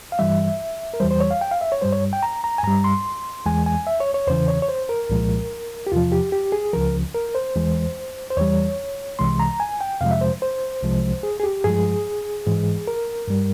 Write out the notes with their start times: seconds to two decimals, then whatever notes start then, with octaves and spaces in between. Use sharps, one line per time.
0.12 F5
0.19 G2 E3 G3 E5
0.94 A#4
1.00 E2 E3 G3 C5
1.11 C5
1.20 C#5
1.31 F5
1.41 G5
1.51 F5
1.61 E5
1.72 C#5
1.82 G2 G3 C5
1.92 C#5
2.13 G5
2.23 A#5
2.44 A#5
2.58 G#5
2.64 G2 G3 A#5
2.84 C6
3.46 E2 E3 G#3 G#5
3.66 G#5
3.87 E5
4.00 C#5
4.14 C#5
4.28 E2 C#3 E3 C5
4.48 C#5
4.62 C#5
4.68 C5
4.89 A#4
5.10 C2 A#2 F3 G#3
5.87 G4
5.91 E2 C3 F3 F4
6.12 G4
6.32 G4
6.52 G#4
6.73 C#2 C#3 F3 A#4
7.14 A#4
7.35 C5
7.55 E2 E3 G#3
8.31 C5
8.37 E2 E3 G3 C#5
9.19 C2 C3 E3 G#3 C6
9.40 A#5
9.60 G#5
9.81 G5
10.01 F2 C3 F3 G#3 F5
10.11 E5
10.21 C5
10.42 C5
10.83 C2 C3 F3 G#3
11.23 G#4
11.40 G#4
11.43 G4
11.64 G2 F3 G#3 G#4
12.47 G#2 E3 G#3
12.88 A#4
13.28 G2 G3